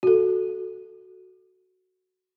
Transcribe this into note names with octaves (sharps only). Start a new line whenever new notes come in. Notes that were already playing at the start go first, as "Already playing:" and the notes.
F#4 A4